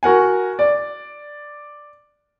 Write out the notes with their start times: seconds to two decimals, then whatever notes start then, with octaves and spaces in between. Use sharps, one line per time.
0.03 F#4 A#4 F#5 G#5
0.59 D5